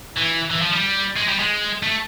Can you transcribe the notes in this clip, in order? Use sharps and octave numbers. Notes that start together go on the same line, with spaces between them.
E3
E3
F3
G3
G#3
G3
G#3
A3